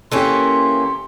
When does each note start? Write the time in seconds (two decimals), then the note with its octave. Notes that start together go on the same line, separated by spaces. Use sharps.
0.12 E3 A#3 C#4 G4 A4 C6